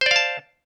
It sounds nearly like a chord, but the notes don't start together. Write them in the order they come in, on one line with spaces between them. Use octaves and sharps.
C5 D5 F5 A5